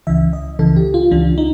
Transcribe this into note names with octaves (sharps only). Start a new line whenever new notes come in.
C#2 C#3 E3 E5
D#5
C#2 C#3 E3 A4
G4
F4
C#2 C#3 E3 D4
D#4